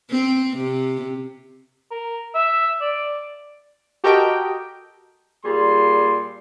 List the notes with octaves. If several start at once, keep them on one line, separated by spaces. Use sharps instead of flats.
C4
C3
A#4
E5
D5
F#4 G4 A4 A#4 D#5 G5
A#2 G3 G#4 C6